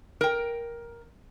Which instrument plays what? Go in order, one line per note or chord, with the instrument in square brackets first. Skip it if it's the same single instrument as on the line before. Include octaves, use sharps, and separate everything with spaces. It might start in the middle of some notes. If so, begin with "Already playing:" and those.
[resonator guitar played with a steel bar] A#4 G5